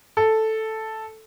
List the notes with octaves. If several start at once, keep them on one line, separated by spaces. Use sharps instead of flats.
A4